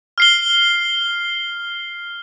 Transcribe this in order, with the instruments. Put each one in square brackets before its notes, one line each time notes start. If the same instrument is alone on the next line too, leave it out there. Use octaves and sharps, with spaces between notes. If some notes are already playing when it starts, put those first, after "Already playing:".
[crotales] F6 C7 G7